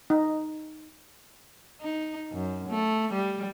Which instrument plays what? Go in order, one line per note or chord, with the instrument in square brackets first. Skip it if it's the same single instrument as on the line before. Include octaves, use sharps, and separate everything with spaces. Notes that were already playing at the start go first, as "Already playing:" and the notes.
[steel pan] D#4
[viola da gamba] D#4
F#2
A3
G3